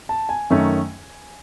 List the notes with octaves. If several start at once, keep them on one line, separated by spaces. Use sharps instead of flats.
A5
G#5
F#2 D#3 A3 C#4